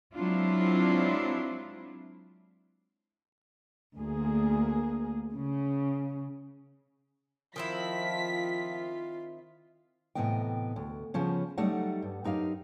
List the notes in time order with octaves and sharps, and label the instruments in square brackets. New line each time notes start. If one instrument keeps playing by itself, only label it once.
[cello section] F#3 G#3 C4 D4 E4 F4
D2 A#3 G#4
C#3
[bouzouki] D#3 C4 E4 [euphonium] F3 [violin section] B6
[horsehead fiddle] F4
[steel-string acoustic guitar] A2 C3 E3 B3 D#5 G5
D2
C#3 F3 B3 C#4
F#3 G3 A3 D#4 F#5
G2
F#2 D#4 G4 F5